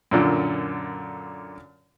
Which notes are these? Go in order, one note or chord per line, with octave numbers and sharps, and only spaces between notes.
F#2 A#2 D3